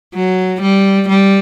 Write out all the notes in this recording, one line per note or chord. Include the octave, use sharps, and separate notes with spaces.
F#3
G3
G3